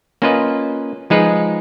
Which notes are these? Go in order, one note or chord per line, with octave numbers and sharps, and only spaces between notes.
A#3 C#4 F4 B4 D#5
F3 G#3 D#4 G#4 B4